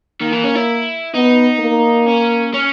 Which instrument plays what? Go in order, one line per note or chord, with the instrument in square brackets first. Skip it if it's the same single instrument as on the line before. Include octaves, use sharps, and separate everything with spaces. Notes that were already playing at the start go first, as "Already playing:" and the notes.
[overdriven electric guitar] D#3 [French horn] A#3
[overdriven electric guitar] E3
C#4
E4
[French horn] B3 [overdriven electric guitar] D#4
[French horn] A#3
[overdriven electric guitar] C#4
C#4